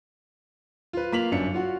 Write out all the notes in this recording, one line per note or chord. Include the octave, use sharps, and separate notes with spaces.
F4 B4
A#3 F4 B6 F7 F#7
G1 F#2 D4 C#7
F4 F#4